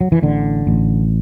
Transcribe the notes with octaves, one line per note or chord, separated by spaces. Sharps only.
F#3
E3
A1 D3
A1